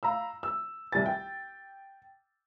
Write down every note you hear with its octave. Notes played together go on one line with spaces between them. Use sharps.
F5 A#5 B5 E6
E6
C2 G3 G4 G#5 A6
G5